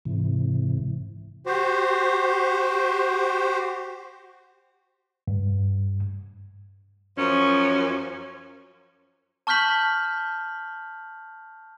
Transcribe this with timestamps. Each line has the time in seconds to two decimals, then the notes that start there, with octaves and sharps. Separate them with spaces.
0.05 G#2 C3 E3
1.46 F#4 G4 C5
5.28 G2
7.17 F#2 F3 C#4
9.47 A5 C#6 F6 G6 B6 F#7